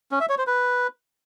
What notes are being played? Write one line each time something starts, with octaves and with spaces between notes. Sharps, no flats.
C#4
E5
C#5
C5
B4